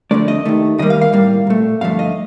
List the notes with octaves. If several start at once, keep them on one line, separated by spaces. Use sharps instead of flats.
F2 D3 A3 D5
D#5
D#2 D#3 A3
D#2 D#3 G3 A#3 D#5
F5
F5
A2 G3 A#3
A#2 A3
G2 D3 F3 A3 F5
D#5